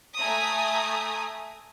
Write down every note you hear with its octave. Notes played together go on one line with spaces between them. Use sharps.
A3 G#5 A#5 D#6